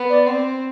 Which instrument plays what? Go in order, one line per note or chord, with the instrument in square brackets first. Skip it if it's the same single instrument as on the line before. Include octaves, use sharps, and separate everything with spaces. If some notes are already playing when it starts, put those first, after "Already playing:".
Already playing: [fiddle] B3
[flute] D5
[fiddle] C4